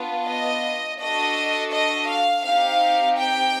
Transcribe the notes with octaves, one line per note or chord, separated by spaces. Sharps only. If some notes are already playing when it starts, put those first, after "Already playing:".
Already playing: B3 D4 F4
D#5
D4 F#4 A4 D#5
D#5
F5
C4 D#4 G4 F5
G5